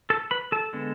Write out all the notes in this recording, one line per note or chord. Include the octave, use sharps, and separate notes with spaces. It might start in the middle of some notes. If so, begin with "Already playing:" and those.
A4 A5
B4 B5
A4 A5
D3 G#3 B3